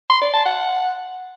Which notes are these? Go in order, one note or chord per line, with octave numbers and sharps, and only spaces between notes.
C6
D5
A5
F#5